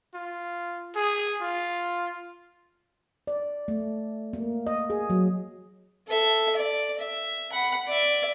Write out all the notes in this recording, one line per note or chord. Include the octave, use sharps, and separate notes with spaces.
F4
G#4
F4
D5
A3
A#3
D#5
G#4
F#3
A4 E5
D5
E5
F#5 B5
D5 E5